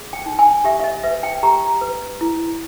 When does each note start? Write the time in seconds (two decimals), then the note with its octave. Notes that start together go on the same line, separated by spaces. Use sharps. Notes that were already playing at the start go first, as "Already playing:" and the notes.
Already playing: G#4
0.13 G5
0.26 D#4
0.39 G#5
0.64 G4 E5
0.79 E5
0.84 D#5
1.03 B4 E5
1.23 G5
1.43 G4 A#5
1.81 B4
2.21 E4